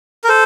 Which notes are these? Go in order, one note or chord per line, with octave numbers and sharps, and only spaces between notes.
A#4
A4 C5